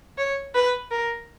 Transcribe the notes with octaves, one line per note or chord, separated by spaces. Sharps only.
C#5
B4
A#4